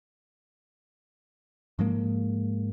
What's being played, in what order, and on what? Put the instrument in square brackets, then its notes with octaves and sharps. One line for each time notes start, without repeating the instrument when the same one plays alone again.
[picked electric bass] G#2 F3 G#3 A#3